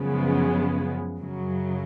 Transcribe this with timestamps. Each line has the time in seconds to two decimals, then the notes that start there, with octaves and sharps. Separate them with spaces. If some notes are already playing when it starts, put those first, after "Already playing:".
Already playing: F#2 C#3 F3 G#3 B3
1.19 F#2 C#3 F#3